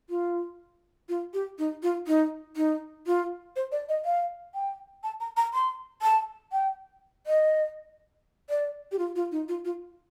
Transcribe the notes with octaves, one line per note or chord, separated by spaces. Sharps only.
F4
F4
G4
D#4
F4
D#4
D#4
F4
C5
D5
D#5
F5
G5
A5
A#5
A#5
C6
A5
G5
D#5
D5
G4
F4
F4
D#4
F4
F4